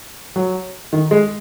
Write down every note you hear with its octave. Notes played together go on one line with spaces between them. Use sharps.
F#3
D#3
G#3